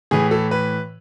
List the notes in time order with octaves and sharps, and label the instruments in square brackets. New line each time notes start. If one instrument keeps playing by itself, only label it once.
[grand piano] A2 E3 G#4
A4
B4